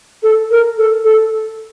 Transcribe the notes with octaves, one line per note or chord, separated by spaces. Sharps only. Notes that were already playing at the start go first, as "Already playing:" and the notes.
A4
A#4
A4
A4